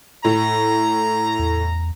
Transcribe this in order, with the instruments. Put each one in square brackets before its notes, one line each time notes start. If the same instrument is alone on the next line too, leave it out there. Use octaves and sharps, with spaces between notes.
[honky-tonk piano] A2 [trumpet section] A#5
[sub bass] E2